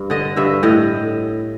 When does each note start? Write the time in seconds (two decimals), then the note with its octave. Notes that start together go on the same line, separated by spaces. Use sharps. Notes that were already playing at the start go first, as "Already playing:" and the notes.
Already playing: G2
0.10 D3 D#5
0.36 G2 E5
0.63 A2 D#5